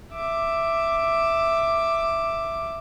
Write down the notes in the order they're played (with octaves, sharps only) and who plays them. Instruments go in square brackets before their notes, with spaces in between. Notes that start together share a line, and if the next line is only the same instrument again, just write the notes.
[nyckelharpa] E5 D6